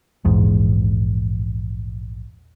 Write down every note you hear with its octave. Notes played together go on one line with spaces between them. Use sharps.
A#1 E2 G#2